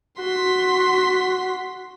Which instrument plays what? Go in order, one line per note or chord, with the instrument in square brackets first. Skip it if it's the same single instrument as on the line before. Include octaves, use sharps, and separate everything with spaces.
[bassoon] F#4 [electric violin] C6 B6